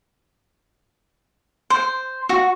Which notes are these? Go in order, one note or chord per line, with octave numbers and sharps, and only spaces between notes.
C5
F#4